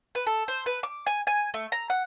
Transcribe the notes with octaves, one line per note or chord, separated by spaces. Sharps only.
B4
A4
C5
B4
D6
G#5
G#5
A3
A#5
F#5